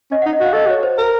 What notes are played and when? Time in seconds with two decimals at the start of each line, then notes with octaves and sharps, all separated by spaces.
0.11 C#4 D#5
0.22 D#4 F#5
0.33 D#5
0.40 F#4 F5
0.53 A4 D#5
0.67 F#4 C#5
0.83 C5
0.98 A#4